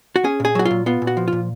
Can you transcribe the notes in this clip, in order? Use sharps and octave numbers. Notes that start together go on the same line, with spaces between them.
F#4
C#4 G#4
A#2 G#4
F#3 F#4
F4
A#2
B3 F4
A#2
F#4
F3
A#2 F4